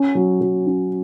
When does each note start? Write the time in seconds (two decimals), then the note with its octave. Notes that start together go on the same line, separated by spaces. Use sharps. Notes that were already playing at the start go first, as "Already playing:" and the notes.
Already playing: C#4
0.15 F#3
0.41 F#3
0.67 C#4